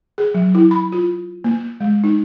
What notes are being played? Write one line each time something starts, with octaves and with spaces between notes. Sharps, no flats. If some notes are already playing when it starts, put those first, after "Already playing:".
G#4
F#3
E4
B5
F4
A#3
G#3
D#4